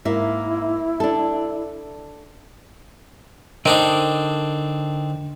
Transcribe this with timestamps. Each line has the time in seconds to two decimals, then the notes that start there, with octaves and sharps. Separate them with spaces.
0.05 G#2 A#3 E4 E5
1.00 D4 A4
3.65 D3 C4 D4 D#4 A#4 D#5